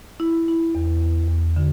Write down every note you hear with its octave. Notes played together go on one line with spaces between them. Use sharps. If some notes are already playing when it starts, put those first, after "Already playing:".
E4
E4
E2
E2
E2
D3